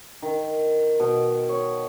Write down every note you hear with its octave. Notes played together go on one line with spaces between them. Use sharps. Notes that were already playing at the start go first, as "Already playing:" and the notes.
D#3
B2
C#5